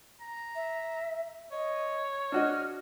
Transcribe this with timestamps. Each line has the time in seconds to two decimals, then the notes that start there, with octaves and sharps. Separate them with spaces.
0.21 A#5
0.55 E5
1.52 C#5 D#5
2.32 D4 F#4 D#5 F6